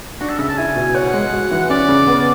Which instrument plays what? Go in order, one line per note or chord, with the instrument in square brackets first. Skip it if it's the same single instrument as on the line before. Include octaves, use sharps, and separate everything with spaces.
[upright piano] D4 [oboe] F#4
[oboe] A4
[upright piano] C#3 [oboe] E5
[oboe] A5
[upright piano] E4 [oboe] G#5
[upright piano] B2
[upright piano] C#5 [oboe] F#5
[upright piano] G#3
F#4
E3
[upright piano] C#4 [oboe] D5
[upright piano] C#3
B3